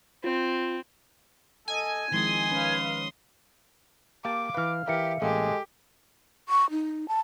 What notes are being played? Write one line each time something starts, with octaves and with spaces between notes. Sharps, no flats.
C4 F4
A4 D#5 G#5
D#3 F3 G#3 C4 E4 C6 D#6
C#4 B4 F5
A#3 G4 F5 A5 D6
E3 B4 F5 F6
E3 G4 A#4 E5 F5 C#7
A1 G#3 A#3 G4 A4
C#6
D#4
A5